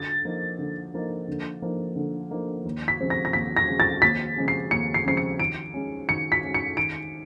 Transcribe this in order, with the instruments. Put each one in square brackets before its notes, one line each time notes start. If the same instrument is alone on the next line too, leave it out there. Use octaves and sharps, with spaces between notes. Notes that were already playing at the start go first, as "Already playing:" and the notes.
Already playing: [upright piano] D3 [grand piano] A6
[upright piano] F3 A#3 D#4
D3
F3 A#3 D#4
D3
F3 A#3 D#4
D3
F3 A#3 D#4
D#2
[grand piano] B6
[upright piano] C#3 F3 G#3 C4
[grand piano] A#6
A#6
[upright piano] D#2 [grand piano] B6
[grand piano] A#6
[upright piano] C#3 F3 G#3 C4
[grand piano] A6
[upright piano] D#2 [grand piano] B6
[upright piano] C#3 F3 G#3 C4
[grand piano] C7
[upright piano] D#2 [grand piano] C#7
[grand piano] C7
[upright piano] C#3 F3 G#3 C4 [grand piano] C7
[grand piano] C#7
[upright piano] D#3 [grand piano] D7
[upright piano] G#3 C#4
[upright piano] D#3 [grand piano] C#7
[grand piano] B6
[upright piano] G#3 C#4
[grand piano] C#7
[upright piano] D#3 [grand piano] D7